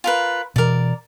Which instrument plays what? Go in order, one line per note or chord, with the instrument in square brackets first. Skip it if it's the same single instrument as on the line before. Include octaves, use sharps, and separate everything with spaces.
[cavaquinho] F4 A#4 B4
[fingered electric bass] B2 E3 [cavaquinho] A#4 D5